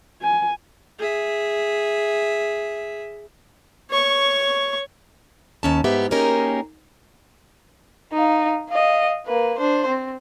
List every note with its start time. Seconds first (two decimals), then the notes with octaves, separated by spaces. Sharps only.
0.22 G#5
0.99 G#4 E5
3.91 C#5 C#6
5.63 D#2 C#4 A5
5.84 G#2 B3 G4 E5
6.11 A#3 C#4 D#4 G4 G#4 A#4
8.13 D#4 F5
8.70 D#5 F5
9.27 A#3 B4
9.59 D4 C5
9.87 C4